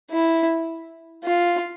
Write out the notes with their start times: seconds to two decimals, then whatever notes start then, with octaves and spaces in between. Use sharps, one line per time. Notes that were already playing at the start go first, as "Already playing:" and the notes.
0.11 E4
1.24 F4